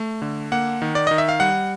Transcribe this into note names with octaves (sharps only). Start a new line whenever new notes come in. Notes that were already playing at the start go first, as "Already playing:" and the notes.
Already playing: A3
D3
A#3 F#5
D#3
D5
D#3 D#5
E5
F5
G3 F#5